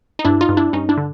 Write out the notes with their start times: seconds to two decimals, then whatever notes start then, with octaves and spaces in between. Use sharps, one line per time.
0.19 D#4
0.25 G2 D4 E4
0.41 D#4 F4
0.49 G2
0.57 D4 E4
0.73 G2 C#4 D#4
0.89 D4 E4
0.97 D3